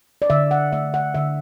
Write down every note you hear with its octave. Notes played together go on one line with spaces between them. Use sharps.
D5
D3 E5
F#5
A3 E5
F#5
D3 E5